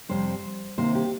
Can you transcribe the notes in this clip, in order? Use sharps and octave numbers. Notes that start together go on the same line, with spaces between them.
F2 C3 G3 C5
C3 D#3 A#3 C5
G4